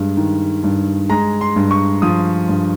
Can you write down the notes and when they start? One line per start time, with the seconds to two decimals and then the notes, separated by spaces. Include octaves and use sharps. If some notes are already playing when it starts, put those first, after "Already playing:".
Already playing: G2 G#3
0.17 D#3
0.64 G2
1.10 G#3 A#5
1.41 C6
1.56 G2
1.71 C#6
2.02 F3 D#6
2.49 G2